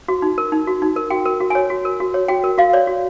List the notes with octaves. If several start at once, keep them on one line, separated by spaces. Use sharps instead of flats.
F#4
D#4
A#4
D#4
F#4
D#4
A#4
F#4 G5
A#4
F#4
C#5 G#5
F#4
A#4
F#4
C#5
F#4 G5
A#4
F#4 F5
C#5 D5
F#4